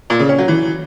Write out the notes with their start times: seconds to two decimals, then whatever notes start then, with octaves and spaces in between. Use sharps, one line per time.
0.10 A#2
0.19 C#3
0.29 C#4
0.39 F#3
0.48 E3